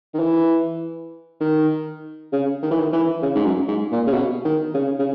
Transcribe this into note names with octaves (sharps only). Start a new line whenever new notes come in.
D#3
E3
D#3
C#3
D#3
E3
D#3
E3
C#3
G#2
F#2
G#2
A#2
C#3
B2
D#3
C#3
C#3